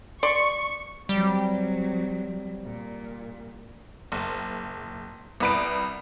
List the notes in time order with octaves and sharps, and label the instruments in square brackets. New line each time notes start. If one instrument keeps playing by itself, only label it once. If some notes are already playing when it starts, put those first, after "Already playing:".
[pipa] D5 C6 [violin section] C#6
[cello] F#3 C4 [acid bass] G3
[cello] A#2
[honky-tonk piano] F#1
C2 B4 D7